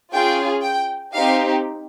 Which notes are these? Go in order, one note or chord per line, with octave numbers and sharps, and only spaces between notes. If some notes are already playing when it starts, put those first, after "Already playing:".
C#4 F4 G#4 G5
G5
C4 D#4 G4 F5